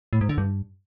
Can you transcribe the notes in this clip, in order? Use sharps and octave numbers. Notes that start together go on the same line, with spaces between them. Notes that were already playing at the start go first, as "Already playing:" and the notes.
A2
G#2
D3
G2